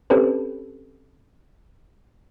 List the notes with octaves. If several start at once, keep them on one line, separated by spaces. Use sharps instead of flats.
C4 C#4 G4 A4 B4